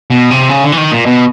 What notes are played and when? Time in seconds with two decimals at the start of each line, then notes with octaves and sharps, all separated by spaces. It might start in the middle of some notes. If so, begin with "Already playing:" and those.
0.10 B2
0.31 C3
0.49 C#3
0.64 D3
0.72 E3
0.77 D#3
0.92 A#2
1.06 B2